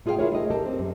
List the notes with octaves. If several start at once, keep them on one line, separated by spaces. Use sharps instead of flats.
A3 F4 G#4 C5 F5 G5
E4 F4 G#4 A#4 C#5
A3 D#5
G4 A4 A#4
C4
F#2